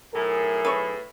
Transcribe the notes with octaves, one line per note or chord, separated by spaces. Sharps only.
B1 A2 G#4 A#4
B4 C#5